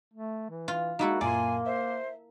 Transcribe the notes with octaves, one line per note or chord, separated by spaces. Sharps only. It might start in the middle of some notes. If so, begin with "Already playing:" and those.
A3
E3
F4
G#3 A#3 D#4 E4 F#4 A4
F#2 A#2 A#3 D5 G#5 C6
C5 E5